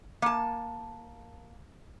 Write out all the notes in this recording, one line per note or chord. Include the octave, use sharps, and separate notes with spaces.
A#3 A5